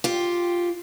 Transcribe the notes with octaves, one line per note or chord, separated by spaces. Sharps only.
F4 G4